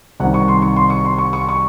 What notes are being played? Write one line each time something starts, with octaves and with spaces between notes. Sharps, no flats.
C2 C3 D#3 F#5
C#6
C6
C#6
C6
C#6
C6
C#6
C#6
C#6